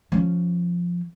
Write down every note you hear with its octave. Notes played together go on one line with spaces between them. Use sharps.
F3 C#4